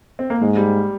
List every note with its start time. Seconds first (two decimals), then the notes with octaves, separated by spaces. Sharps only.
0.19 C4
0.30 A#3
0.41 G#2 G#3
0.57 G3